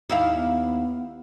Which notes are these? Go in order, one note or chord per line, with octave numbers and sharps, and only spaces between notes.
D#2 E4 F5
B3